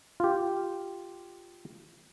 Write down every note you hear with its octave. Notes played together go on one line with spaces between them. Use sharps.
F4 G4